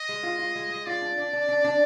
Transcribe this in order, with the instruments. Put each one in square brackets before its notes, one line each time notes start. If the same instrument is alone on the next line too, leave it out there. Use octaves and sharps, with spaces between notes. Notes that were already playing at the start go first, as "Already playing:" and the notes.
Already playing: [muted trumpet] D#5
[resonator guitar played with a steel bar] G#3
F4
F4
G#3
G#3
[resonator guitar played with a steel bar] F4 [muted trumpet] D5
[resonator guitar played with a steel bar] D4
D4
D4
D4
D4